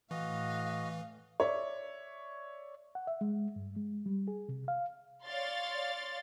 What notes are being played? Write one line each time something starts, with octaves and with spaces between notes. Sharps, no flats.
A2 E3 F#4 D#5 F5
C#5 D5 E5
F#5
E5
G#3
G2
G#3
G3
G#4
C3
F5
C#5 D5 F5 C6 A6